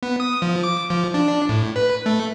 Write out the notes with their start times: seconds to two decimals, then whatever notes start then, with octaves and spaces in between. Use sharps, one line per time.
0.03 B3
0.20 D#6
0.42 F3
0.63 D6
0.90 F3
1.14 D4
1.49 A2
1.76 B4
2.06 A3